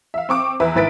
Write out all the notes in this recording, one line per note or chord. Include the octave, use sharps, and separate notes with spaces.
E5 F5
C4 C#6 D6
E2 B4 E5
G#1 E4 B4 A6 B6 D7